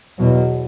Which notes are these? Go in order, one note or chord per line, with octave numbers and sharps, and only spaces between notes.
E2 B2 F#3